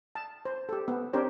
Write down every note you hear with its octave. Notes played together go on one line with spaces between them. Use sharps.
A5
C5
G4 A4
B3
C4 D4 G4 A#4 C5 C#5